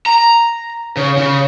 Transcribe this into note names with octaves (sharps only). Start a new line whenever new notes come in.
A#5
C#3
C#3